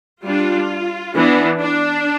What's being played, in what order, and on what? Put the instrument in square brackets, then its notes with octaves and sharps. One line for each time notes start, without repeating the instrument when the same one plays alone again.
[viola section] G3 D4 F4
E3 B3 D4
D4